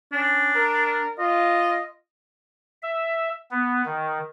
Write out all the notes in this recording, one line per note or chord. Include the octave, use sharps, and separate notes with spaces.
C#4 D4
A#4
F4 D#5
E5
B3
D#3